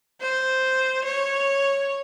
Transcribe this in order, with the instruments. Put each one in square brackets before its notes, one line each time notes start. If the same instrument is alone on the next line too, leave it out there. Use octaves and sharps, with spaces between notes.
[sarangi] C5
C#5